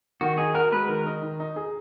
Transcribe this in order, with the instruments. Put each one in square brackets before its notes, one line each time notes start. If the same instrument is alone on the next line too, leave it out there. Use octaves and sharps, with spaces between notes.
[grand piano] D#3 [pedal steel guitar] F#4
[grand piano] D#4 [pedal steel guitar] G#4
[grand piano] F#4 [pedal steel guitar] A#4
[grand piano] G#3 [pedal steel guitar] B4
[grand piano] D#3 [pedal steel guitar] A#4
[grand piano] D#4
D#3
D#4
G#4